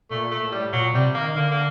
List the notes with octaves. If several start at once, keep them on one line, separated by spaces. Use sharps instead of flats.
A#2 A3
A3
A2
G3
A#2 F#3
C3 G3
D#3 A#3
D3 A#3
A#3